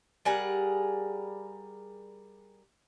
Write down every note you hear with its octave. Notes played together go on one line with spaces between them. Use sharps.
G3 G#4 A#4 F#5